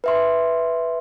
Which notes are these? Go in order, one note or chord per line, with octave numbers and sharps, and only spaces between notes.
B4 E5 C6